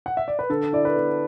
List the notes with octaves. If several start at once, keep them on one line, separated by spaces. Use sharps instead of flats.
F#5
E5
D5
B4
D3 A4
E4 D5
B4
B3